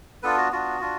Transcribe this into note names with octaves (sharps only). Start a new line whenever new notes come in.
B3 D4 F4 A4 B4
F#4
B3 D4 F4 F#4
D4 F4